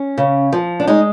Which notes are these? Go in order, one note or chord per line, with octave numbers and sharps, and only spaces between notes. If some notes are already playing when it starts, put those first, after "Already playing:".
Already playing: C#4
C#3
F3
D4
G#3 D#4